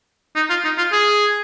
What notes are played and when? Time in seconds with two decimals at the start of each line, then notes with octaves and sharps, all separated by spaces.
0.36 D#4
0.50 F4
0.65 D#4
0.78 F4
0.92 G#4